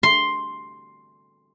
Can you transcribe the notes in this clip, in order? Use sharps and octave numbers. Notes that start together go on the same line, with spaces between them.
C6